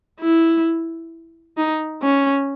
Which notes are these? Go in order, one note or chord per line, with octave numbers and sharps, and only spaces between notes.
E4
D#4
C#4